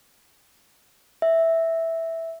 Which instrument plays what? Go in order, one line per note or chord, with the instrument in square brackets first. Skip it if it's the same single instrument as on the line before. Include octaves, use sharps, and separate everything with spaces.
[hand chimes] E5